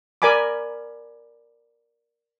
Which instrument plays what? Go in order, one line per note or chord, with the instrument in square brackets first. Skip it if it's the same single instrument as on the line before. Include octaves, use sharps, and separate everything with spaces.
[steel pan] A#4 D5 G#5 B5 D6